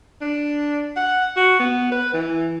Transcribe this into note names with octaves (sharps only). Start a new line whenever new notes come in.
D4
F#5
F#4
B3
B4
E3